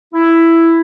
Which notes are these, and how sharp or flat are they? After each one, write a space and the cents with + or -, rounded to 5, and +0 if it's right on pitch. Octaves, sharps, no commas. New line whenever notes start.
E4 +5